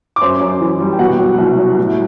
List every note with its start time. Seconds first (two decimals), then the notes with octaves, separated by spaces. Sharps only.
0.16 D6
0.22 F#2 C5 C6
0.41 F#2
0.61 E3
0.80 G3
0.92 G5
0.99 B2 F#4 F#5
1.19 F#3
1.38 C2
1.58 F#3
1.78 A2